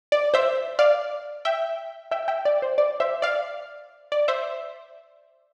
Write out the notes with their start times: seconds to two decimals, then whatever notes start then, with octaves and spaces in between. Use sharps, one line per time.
0.12 D5
0.34 C5 E5
0.79 D5 F5
1.45 E5 G5
2.11 E5 G5
2.28 E5 G5
2.45 D5
2.62 C5
2.78 D5
3.00 C5 E5
3.22 D5 F5
4.12 D5
4.28 C5 E5